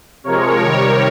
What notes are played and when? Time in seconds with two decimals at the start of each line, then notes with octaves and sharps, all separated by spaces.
0.23 C3 F3 G#3 A#4 C#5
0.61 C3 D#3 G3